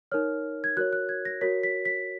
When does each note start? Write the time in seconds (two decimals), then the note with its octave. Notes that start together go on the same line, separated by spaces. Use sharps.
0.12 D#4 A#4 C#5 F6
0.64 G#6
0.77 F#4 A#4 C#5 F#6
0.93 F#6
1.09 G#6
1.25 A#6
1.41 F#4 A#4 C#5 B6
1.63 B6
1.85 B6